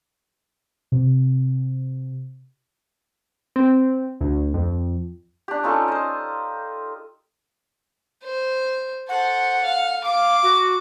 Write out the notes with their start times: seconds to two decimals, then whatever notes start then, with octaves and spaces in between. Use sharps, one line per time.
0.92 C3
3.56 C4
4.21 D2
4.54 F2
5.48 D4 G4
5.63 C#4 D#4 F4 A4
5.88 C5 D#5
8.23 C5
9.09 A4 C5 F#5
9.63 F5
10.04 F5 D6
10.43 F#4